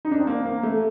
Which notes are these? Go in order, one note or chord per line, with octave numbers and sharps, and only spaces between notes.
D#4
D4
C4
A#3
A#3
A3